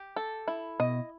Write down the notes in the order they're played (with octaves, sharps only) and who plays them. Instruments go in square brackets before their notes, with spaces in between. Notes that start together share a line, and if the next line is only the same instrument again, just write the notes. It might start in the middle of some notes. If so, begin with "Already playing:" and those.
Already playing: [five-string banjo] G4
A4
E4
[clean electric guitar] B2 [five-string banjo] D#5